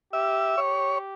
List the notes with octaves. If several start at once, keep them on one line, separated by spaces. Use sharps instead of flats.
G4 E5
G4 C#5